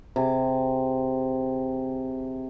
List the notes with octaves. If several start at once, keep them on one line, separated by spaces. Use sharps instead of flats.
C3 G#4 D6